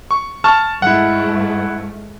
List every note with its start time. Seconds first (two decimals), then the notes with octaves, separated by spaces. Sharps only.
0.11 C#6
0.44 A5 C#6 F6
0.82 G#2 A3 E4 F#5